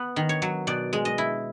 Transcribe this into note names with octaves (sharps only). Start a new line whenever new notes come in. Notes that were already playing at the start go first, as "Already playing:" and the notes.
Already playing: B3
D#3
C#5
F#3
B2 D5
G#3
D#5
E4